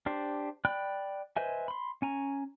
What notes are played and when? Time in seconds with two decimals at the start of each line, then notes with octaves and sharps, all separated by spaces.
0.06 D4 G4 C5
0.65 D5 G5 B5 F#6
1.37 B4 C5 D#5 E5 G#5
1.68 B5 C6
2.02 C#4 G#5 A#5